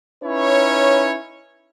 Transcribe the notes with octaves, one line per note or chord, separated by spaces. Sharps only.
C#4 D#4 E4 B4 C#5